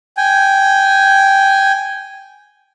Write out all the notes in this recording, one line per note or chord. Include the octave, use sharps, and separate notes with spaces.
G5 G#5